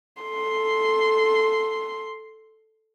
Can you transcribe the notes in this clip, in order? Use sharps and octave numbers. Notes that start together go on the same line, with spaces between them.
A4 C6